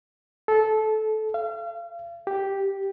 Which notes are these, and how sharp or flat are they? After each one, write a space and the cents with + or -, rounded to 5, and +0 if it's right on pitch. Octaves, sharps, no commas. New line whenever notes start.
A4 -20
F5 -40
G4 +0